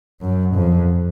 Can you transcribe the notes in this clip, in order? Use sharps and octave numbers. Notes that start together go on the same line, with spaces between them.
F#2
F2